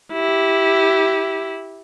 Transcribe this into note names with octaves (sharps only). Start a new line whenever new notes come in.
E4 G4